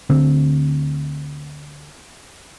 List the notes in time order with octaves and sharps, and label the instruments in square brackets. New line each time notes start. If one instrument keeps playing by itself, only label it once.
[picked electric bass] D2 D3 C4